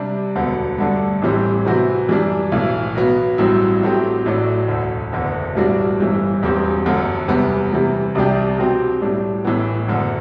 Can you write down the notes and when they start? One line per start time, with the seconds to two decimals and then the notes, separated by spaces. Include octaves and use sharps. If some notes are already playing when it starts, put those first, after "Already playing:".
Already playing: C3 G3 D4
0.35 E1 D2 D3 F#3 B3
0.78 G2 D3 A3 D4
1.22 A1 A2 E3 G3 C4
1.65 C3 E3 B3 F#4 C5
2.09 F#2 E3 G3 D4
2.52 B1 A2 E3
2.95 B2 F#3 B3
3.38 A1 G2 F#3 C4 E4
3.81 A2 F#3 A3 C4 G4
4.25 A1 A2 F#3 A3 D4
4.68 E1 D2 D3
5.12 F#1 E2 D3
5.55 B1 A2 G3 D4 F#4
5.99 G1 G2 E3
6.42 E1 E2 B2 G3 C4
6.85 G1 F#2 D3
7.28 E2 C3 G3 B3
7.72 C3 E3 G3 B3
8.15 C2 C3 G3 D4 G4
8.58 B2 F#3 C4 G4
9.01 A2 G3 D4
9.44 A1 A2 E3 B3
9.88 F#1 F#2 D3